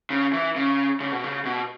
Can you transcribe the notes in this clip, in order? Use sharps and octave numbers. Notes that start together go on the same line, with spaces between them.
C#3
E3
C#3
C#3
B2
C#3
B2